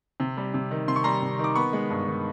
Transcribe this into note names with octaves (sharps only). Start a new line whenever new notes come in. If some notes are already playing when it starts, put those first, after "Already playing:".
C3
G3
C3
D#3
C3 C6
C#6
G3 A#5 C6
C3
D#3
D6
B3 B5 C#6
G#3
G2
D#3